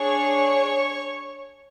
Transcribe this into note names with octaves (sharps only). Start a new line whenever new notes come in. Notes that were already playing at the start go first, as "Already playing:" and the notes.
Already playing: D4 G#4 C#5 C#6